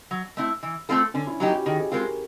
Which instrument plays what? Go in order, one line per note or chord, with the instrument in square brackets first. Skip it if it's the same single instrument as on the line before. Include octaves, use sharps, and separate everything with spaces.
[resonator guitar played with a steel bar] F#3
A3 C4 E4
E3
A3 C4 F4 A4
[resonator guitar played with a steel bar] D3 [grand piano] C#4
[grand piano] E4
[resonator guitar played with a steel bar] F#3 A#3 D#4 G4 [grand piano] F#4
[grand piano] G4
[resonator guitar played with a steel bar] D#3 [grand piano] G#4
[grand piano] A4
[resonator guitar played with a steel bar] G#3 C4 F4 [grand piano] A#4
[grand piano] A4